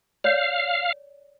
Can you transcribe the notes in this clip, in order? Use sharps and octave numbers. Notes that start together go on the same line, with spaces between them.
C#5 D5 F5